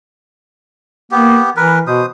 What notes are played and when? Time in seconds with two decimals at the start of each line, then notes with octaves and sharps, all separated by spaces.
1.11 A#3 B3 G4
1.57 E3 A#4 B4
1.87 B2 C5 D#6